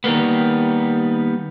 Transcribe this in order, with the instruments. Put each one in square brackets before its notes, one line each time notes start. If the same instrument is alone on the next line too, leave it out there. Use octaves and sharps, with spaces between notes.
[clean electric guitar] D#3 G3 A#3 B3